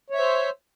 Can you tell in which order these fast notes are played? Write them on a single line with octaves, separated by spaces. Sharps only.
C#5 E5 C5